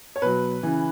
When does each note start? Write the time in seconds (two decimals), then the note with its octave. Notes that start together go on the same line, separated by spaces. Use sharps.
0.16 C#5
0.22 B2 F#3 B4
0.63 C#3 E3